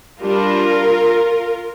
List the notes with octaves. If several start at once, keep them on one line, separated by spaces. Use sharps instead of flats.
G3 D4 F4 A#4